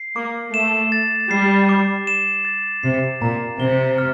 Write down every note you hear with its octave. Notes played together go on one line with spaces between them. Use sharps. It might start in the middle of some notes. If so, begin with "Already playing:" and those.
Already playing: C7
A#3 D6
A3 E7
A6
G3 C7
D6
E7
A6
C3 C7
A#2 A#5
C3 G7
F6